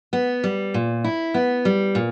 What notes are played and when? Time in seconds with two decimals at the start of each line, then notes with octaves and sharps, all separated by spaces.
0.13 B3
0.44 G3
0.74 A#2
1.04 E4
1.34 B3
1.65 G3
1.95 A#2